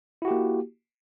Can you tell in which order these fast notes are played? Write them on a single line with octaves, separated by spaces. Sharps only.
E4 F#4 G4 A#3